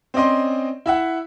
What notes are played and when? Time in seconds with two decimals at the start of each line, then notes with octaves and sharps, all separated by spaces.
0.14 C4 C#4 D5 D#5 C6
0.86 E4 E5 F#5